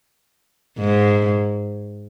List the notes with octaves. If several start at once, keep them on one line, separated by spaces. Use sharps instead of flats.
G#2